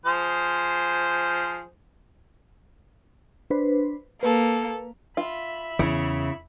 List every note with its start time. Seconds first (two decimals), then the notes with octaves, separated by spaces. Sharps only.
0.06 F3 G#4 C5
3.50 D4 B4 C5
4.23 A#3 A4 B4
5.17 F4 E5 B5
5.79 E2 C#3 E4